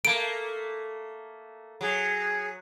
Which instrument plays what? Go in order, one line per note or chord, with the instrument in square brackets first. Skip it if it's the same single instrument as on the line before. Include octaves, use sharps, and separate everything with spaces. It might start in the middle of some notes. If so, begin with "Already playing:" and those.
[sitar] A3 A#3 [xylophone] D7
[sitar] F#3 [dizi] G#4